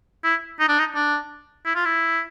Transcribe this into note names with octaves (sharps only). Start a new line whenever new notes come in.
E4
D#4
D4
D#4
D4
E4
F4
E4